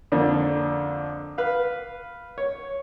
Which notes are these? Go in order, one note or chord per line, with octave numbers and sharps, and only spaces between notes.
F2 D3 A#3 D4
B4 F5
C#5